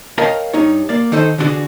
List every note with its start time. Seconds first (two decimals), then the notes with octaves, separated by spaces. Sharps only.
0.18 A#4 C#5 D#5 F5 G5 A5
0.53 G2 D#4 C#5
0.89 A#3 D5
1.12 D#3 D#4 A4 C5 D#5
1.38 D3 E3 G3 D4 F#4 G#4